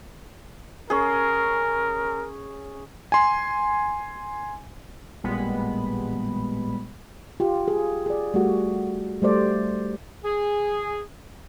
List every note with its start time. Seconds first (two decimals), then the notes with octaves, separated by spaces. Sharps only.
0.90 C#4 G#4 A#4
3.12 G#5 C6
5.23 A1 A#2 G3 G#3 B3 B5
7.40 F4 G4
7.68 G#4
8.06 G#4 D5
8.34 G3 A3 F#4
9.22 G3 A3 C5 D5
10.25 G#4